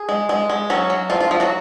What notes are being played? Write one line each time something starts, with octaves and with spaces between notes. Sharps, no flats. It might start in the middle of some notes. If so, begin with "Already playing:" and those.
Already playing: G#4
G#3
G#3
G#3
F#3 C#4 F#4
F#3
F3 F4
F4
F3
F#3 F#4